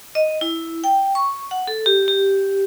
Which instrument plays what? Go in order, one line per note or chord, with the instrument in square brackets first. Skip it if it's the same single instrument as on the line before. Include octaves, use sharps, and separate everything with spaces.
[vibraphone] D#5
E4
G5
C#6
F#5
A4
G4
G4